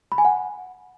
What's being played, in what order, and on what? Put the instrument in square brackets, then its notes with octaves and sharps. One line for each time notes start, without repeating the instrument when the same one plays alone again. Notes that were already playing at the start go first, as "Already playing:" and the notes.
[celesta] B5
G#5
F#5